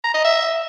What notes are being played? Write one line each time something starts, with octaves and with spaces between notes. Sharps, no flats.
A#5
D#5
E5